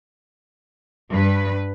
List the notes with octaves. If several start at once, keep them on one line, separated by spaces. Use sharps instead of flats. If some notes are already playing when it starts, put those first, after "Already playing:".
G2 B4